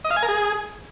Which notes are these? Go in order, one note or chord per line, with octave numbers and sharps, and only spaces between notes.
D#5
F5
G#5
A#4
G#4